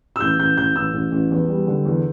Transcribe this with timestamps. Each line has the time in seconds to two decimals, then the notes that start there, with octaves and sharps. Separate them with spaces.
0.16 E6
0.20 A1 G6
0.39 A1 G6
0.57 A1 G6
0.76 A1 E6
0.94 A1
1.12 A1
1.31 E2
1.48 G3
1.67 D3
1.85 E2